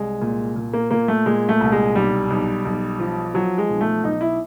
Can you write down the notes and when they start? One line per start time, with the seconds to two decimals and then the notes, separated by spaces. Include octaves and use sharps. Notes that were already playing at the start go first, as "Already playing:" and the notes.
Already playing: C2 G#3
0.21 A#2
0.56 A#2
0.73 A#3
0.91 A#2 A#3
1.08 A3
1.26 A#2 G#3
1.49 A3
1.60 C2
1.72 G#3
1.95 B1 G3
2.30 B1
2.65 B1
3.00 F3
3.34 F3 F#3
3.58 G#3
3.69 B1
3.81 A3
4.04 B1 D#4
4.21 E4